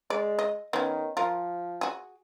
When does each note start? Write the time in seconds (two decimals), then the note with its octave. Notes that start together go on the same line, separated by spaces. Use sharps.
0.10 G#3 D5
0.39 D#5
0.73 D#3 B3 C#4
1.17 F3 F4 A#4
1.81 F#4 G#4